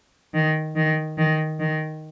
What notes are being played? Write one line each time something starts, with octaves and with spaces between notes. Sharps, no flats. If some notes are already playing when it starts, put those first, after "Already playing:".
D#3
D#3
D#3
D#3